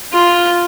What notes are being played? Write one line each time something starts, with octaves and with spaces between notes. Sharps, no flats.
F4